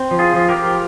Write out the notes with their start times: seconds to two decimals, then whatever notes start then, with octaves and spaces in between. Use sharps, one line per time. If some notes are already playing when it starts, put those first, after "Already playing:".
Already playing: C4
0.11 F3
0.19 F4 G#4
0.34 F3
0.49 G4 A#4
0.56 F3